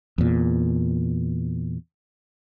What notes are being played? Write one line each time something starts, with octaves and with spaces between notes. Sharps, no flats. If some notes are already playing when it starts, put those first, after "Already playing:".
E2 A#2